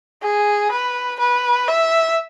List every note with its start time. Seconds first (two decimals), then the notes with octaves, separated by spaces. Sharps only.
0.22 G#4
0.71 B4
1.19 B4
1.68 E5